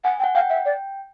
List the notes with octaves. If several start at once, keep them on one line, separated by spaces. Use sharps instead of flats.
F#5 G#5
G5
F#5
F5 G5
E5
D5